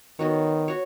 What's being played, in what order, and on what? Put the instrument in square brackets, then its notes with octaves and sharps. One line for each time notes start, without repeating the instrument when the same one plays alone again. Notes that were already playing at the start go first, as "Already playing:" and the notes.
[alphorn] D#3 [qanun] B3 D#4 F#4 C#5
[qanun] F#4 C#5